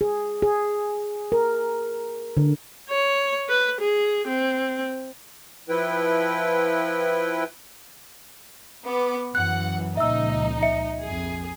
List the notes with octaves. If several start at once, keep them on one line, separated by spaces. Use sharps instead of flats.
G#4
G#4
A#4
D3
C#5
B4
G#4
C4
F3 E4 B4 G5
B3 D6
F#2 E3 F#5 F#6
C#2 A#2 F3 D#4 E5 E6
E5 C#7
A#1 F2 G#4